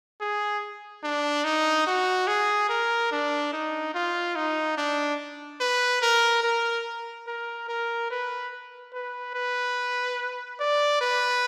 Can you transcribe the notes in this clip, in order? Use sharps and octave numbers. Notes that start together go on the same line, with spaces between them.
G#4
D4
D#4
F#4
G#4
A#4
D4
D#4
F4
D#4
D4
B4
A#4
A#4
A#4
A#4
B4
B4
B4
D5
B4